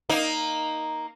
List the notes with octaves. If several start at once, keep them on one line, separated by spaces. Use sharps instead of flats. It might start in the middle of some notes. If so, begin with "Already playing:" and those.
A#3 D#4